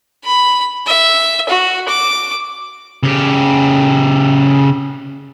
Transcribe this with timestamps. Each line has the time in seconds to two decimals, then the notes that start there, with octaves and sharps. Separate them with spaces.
0.24 B5
0.87 E5
1.49 F#4
1.88 D6
3.03 C#3 G4